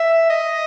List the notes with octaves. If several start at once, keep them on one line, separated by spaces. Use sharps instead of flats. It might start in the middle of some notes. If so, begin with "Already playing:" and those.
Already playing: E5
D#5